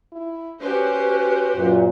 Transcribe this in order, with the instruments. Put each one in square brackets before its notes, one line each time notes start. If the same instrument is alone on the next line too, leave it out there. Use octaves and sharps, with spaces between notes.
[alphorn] E4
[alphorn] C#4 [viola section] F#4 G4 C5 [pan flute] B4
[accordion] F#2 A#2